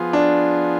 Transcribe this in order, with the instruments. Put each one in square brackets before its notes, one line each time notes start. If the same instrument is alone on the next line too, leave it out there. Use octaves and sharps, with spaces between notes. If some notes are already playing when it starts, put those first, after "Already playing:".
Already playing: [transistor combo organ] F3 B3 F4 G#4
[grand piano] D4